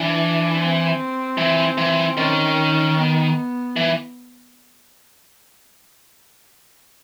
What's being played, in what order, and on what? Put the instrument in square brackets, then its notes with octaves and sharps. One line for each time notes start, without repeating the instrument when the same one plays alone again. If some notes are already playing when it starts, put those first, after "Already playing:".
Already playing: [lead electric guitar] E3 [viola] D4
[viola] C4
[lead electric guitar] E3
E3
[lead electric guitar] D#3 [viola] C#4
[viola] B3
[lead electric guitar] E3